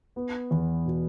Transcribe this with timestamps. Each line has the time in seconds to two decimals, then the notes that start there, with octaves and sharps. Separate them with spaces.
0.16 B3
0.51 E2
0.86 B2